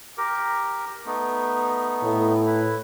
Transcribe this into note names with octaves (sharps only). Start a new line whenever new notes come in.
G4 A#4
A3 B3 D#4
A2
E4 B4